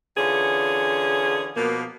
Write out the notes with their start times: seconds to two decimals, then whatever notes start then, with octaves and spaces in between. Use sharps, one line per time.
0.17 D3 E3 C#4 F4 G#4
1.56 B2 F3 A#3